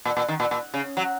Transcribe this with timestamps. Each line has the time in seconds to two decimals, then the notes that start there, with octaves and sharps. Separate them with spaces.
0.05 A#2
0.17 A#2
0.28 D#3
0.40 A#2
0.51 A#2
0.74 C#3
0.97 F#3